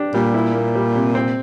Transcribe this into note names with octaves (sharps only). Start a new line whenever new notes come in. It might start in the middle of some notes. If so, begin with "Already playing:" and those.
Already playing: D4 G4
A#2 G3
E4
A#3
G3
C3
C4